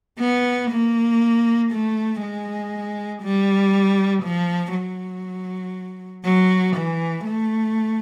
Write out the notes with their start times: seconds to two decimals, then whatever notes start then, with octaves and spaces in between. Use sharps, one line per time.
0.19 B3
0.71 A#3
1.72 A3
2.22 G#3
3.23 G3
4.23 F3
4.74 F#3
6.25 F#3
6.76 E3
7.26 A3